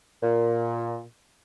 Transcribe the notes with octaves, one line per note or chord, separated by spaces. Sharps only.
A#2